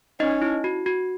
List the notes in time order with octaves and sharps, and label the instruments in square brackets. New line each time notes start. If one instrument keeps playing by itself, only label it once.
[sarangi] C#4 [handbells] D#4 D#5
[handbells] E4
F#4
F#4